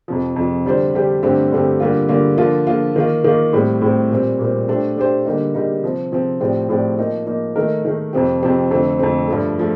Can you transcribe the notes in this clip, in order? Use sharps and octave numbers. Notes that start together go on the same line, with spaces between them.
F2 C3 F3
F2 C3 F3
D3 G3 D4 G4 C5
D3 G3 D4 G4 C5
G2 D3 A3 C4 G4
G2 D3 A3 C4 G4
D3 G3 A#3 F4
D3 G3 A#3 F4
D3 F3 A#3 F4
D3 F3 A#3 F4
D#3 A#3 F4
D#3 A#3 F4
A2 G3 C4
A2 G3 C4
A#2 G3 C4
A#2 G3 C4
A3 D4 G4 C5
A3 D4 G4 C5
D3 G3 A#3 D#4
D3 G3 A#3 D#4
C3 F3 C4
C3 F3 C4
A2 F3 C4 G4 D5
A2 F3 C4 G4 D5
F3 A#3 D#4
F3 A#3 D#4
D#3 A3 D#4 A#4
D#3 A3 D#4 A#4
F2 C3 F3 C4 G4
F2 C3 F3 C4 G4
F2 D3 A3 C4
F2 D3 A3 C4
G2 F3 A3
F3 A3